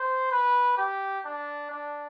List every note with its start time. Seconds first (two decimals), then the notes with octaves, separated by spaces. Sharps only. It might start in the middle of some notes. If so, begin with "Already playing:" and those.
Already playing: C5
0.31 B4
0.77 G4
1.25 D4
1.70 D4